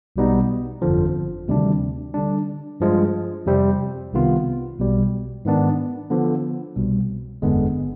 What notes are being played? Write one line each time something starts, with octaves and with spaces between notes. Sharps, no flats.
B1 B2 G3 B3 D#4
G1 F2 D3 F3
D2 C3 D#3 G3 D4
D3 G3 D4
G2 F3 G#3
F2 C3 G3 C4
C2 C3 D#3 B3 F4
B1 B2 G3
G#2 D#3 B3 D4
D3 F3 B3
C2 B2 G3
G1 F2 D3 G#3 B3